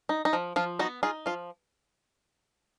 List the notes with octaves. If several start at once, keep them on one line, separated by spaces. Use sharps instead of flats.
D#4
D#4
F3
F3 F4
B3 D#4 F#4
D#4 F4 G#4
F3 F4